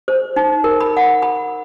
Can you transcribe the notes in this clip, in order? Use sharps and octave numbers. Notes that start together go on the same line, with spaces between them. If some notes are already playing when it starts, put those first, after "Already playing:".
C5
D#4
A#4
B5
F#5
B5